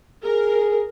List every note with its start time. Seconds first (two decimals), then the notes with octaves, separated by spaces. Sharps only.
0.24 G#4 A#4